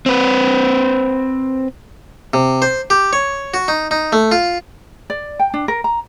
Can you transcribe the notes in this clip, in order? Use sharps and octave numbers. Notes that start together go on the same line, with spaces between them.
C4 B4
C3
C5
G4
C#5
F#4
D#4
D#4
A3
F4
D5
G5
D4
A#4
A#5